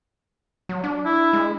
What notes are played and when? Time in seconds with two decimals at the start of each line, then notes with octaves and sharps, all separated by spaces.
0.69 F#3
0.84 D4
1.05 E4
1.33 G#3